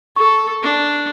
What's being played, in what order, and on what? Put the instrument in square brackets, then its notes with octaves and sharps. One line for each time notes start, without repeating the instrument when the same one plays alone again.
[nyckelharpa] A4 [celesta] C#6
[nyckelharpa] D4